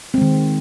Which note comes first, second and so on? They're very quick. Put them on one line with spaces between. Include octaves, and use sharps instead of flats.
C4 G#3 D#3